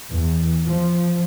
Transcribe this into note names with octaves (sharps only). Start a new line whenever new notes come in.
E2
F3